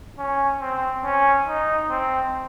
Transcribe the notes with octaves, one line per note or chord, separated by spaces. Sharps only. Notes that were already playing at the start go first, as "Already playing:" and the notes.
C#4
C4
C#4
D#4
C4